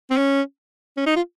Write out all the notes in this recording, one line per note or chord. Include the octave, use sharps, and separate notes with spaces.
C4
C#4
C#4
D#4
F4